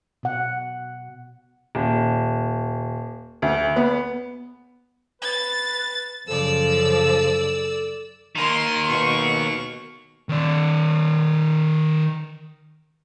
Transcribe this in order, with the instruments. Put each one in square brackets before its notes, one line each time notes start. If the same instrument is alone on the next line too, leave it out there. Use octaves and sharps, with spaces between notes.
[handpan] B2 F#5
[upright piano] D#1
D2
B3
[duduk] B4 [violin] A6
[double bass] F#2 C#3 [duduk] F3 [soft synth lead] A4 [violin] D5 E6
[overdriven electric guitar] D#3 A#3 [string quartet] C6
[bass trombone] B2 [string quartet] C#6
[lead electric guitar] D#3 D5